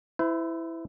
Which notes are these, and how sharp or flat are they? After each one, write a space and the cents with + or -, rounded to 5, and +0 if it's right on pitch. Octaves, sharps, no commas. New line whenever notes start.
E4 +0 C5 -45